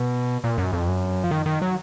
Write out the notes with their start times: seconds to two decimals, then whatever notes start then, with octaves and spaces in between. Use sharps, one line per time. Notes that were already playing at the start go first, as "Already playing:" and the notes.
Already playing: B2
0.44 A#2
0.58 F#2
0.73 F2
0.88 F#2
1.24 F3
1.31 D#3
1.46 D#3
1.62 F#3